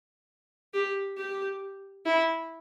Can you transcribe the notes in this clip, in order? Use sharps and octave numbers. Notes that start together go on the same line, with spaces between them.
G4
G4
E4